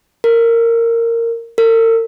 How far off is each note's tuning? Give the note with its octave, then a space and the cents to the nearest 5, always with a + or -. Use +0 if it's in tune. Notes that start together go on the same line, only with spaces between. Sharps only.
A#4 -15
A#4 -45